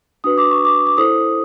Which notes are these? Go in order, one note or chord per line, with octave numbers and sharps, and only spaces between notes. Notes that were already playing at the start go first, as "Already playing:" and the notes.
D4 F#4 B4 D#6
D6
C#6
D6
D6
E4 A4 C5 D#6